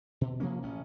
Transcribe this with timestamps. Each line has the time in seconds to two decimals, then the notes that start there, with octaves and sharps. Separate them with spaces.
0.21 B2
0.40 C3 F3 A#3 C#4
0.63 A1 C#4